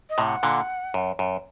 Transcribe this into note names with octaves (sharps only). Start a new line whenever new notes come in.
D#5
A2 C3
F#5
A#2 D3
F#2
F#2